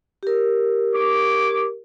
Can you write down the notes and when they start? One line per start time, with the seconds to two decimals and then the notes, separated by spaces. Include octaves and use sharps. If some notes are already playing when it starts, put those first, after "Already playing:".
0.23 G4 A#4
0.94 C#5 D6